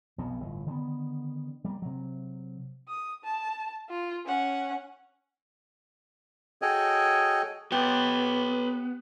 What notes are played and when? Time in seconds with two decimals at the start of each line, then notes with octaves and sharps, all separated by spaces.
0.18 B1 F2 B2
0.40 G1 A2
0.66 D3 D#3 G#3 B3
1.65 G3 A#3
1.82 C3 F#3
2.88 D#6
3.24 A5
3.89 F4
4.26 C#4 F#5
6.62 F#4 G#4 A4 C#5 D#5 G5
7.72 B3 G4 B4 C#5